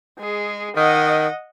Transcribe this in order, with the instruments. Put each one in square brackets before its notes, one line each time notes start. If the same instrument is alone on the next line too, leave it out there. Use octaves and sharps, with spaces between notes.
[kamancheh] G#3 G#4
[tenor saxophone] D#3 [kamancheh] D#5 F#5